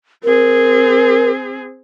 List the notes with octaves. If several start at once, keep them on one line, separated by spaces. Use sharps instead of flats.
C4 G#4 A#4